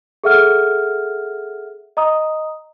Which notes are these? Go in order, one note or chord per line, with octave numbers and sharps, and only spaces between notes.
G#4 A4 E5 F#5 F6
D#5 A#5 D#6